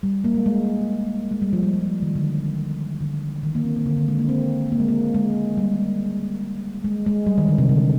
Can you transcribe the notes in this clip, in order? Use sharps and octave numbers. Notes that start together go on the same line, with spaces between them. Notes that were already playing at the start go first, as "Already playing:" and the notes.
G3
A#3
G#3
G#3
G#3
G3
F3
G3
G3
F3
D#3
D3
D3
D#3
A#3
C4
A#3
D3
D3
G#3
A#3
C4
A#3
G#3
A#3
G#3
G3
G#3
G#3
G3
D#3
D3
C3
D3